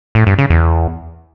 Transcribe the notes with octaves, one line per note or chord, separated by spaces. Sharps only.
A2
G2
C#3
E2